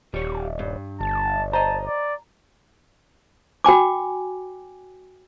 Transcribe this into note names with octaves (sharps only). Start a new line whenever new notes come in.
D#1 G3 C#5
G2
G1 A5
C5 D#5 A5 A#5
D5
F#4 G5 G#5 D6